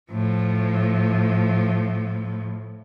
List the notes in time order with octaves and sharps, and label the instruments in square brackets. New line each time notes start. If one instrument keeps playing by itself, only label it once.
[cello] A2 F3